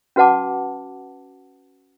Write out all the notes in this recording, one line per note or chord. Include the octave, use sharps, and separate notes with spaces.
C#4 F#4 B4 F#5 A5 D6